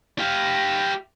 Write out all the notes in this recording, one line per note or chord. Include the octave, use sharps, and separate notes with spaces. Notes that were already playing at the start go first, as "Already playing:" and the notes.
G4 F5